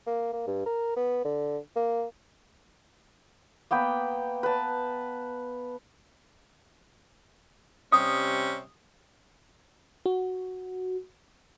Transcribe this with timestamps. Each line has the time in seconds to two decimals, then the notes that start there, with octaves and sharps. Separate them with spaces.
0.06 A#3
0.33 A#3
0.47 G2
0.66 A#4
0.96 B3
1.25 D3
1.76 A#3
3.71 A#3 B3 G5 B5
4.43 B4 A5
7.92 C3 G3 C#4 D#6
10.06 F#4